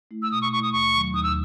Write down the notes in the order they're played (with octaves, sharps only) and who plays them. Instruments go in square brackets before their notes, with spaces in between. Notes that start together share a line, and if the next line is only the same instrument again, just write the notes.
[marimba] A3 E4
[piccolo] E6
[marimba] B2 [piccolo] D#6
[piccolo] C#6
[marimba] A3 E4 [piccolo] C#6
[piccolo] D#6
[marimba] D#2 [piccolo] C#6
[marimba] D#3 F#3
[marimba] D#2 [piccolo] D#6
[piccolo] E6